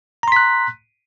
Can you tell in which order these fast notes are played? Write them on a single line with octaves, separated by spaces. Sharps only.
A#5 C6 B6 F#6